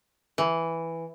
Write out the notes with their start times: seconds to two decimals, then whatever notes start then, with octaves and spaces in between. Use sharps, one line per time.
0.38 E3